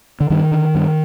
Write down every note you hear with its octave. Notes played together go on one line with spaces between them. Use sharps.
D3
G2 D#3
D3
G2